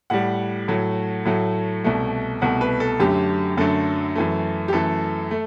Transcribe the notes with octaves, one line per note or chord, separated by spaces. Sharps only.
A2 G3 F#5
A2 F#3 A3
A2 F#3 A3
C2 B2 A3
C2 B2 A3 F#5
B4
A4
F#2 D3 F#3 A3 G4
F#2 D3 F#3 A3 A4
F#2 E3 A3
G4
F#2 E3 A3 A4
A3